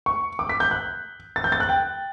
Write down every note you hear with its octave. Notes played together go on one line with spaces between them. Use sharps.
C#6
D6
B6
G6
F#6
A6
G6
A6
F#6
G5